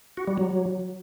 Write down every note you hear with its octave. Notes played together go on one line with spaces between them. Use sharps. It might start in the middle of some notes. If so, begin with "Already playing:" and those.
F#4
G3
F#3